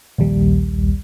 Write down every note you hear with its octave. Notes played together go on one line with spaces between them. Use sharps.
A#1 D#2 G3